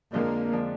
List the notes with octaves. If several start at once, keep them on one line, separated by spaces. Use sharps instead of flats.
F2 D3 F3 G#3 A#3 D4
D3 F3 G#3 D4